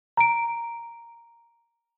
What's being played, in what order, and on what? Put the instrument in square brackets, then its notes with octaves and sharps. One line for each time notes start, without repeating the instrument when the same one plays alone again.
[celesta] A#5 D7